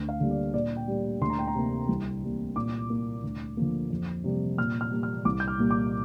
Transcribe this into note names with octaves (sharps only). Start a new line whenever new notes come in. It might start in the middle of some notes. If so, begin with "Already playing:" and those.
Already playing: D2
F5
D3 G3 A#3
D5
A#2 D5
G5
G3 A#3
D2 C6
A#5
G5
A#5
C3 A#3
C2
C3 G3 A#3
A#2 D6
A#3
D2
D3 F3 A#3
F2
C3 G3 A#3
A#2 F6
F6
G3 A#3
F6
C2 D6
G6
F6
A#2 G3 A#3
D6